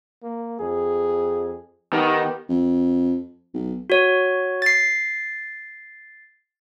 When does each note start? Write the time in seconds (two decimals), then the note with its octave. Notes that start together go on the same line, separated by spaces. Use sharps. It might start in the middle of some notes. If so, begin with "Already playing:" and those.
0.23 A#3
0.60 F2 G#4
1.93 D#3 B3 G4
2.49 F2
3.54 B1
3.90 F#4 C#5
4.62 A6 C7